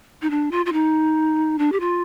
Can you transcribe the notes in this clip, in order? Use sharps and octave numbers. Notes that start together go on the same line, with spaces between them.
D#4
D4
F4
F4
D#4
D4
G4
F4